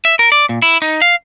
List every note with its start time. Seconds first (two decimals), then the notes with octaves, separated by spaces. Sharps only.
0.05 E5
0.19 A#4
0.32 D5
0.49 A#2
0.62 E4
0.82 D#4
1.02 F5